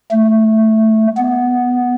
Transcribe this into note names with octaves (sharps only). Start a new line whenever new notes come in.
A3
B3